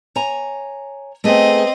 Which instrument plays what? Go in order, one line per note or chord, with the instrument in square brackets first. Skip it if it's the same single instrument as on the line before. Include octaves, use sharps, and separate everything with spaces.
[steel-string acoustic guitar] C#5 G#5 A#5
[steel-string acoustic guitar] A3 B3 G#4 [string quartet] C4 D#5